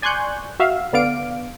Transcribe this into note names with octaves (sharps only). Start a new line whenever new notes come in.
D5 G#5 C6 C#6 F#6 G6
F#4 E5 F5
D3 B3 D5 F5 D7